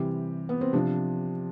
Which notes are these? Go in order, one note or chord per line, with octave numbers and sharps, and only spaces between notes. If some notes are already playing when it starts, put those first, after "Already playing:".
Already playing: C3 E3 G3 G4
B3
C4
C3 F3 D4